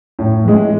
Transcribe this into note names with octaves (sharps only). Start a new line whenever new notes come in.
A2
E3 G#3